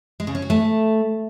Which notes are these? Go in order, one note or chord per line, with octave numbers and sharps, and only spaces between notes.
G#3
C#3
C#4
F#4
A3